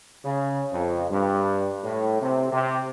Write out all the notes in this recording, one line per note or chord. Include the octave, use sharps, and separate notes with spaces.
C#3
F2
G2
A2
C3
C3